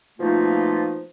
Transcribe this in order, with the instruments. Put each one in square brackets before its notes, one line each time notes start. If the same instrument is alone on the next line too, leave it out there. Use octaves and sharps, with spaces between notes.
[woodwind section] B2 F3 A3 A#3 D#4 F4